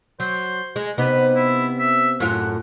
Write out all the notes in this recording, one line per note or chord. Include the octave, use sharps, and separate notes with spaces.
F#3 C5
G#3
C3 B3 D#4 B4
E4
E5
F#2 A2 F4 F#5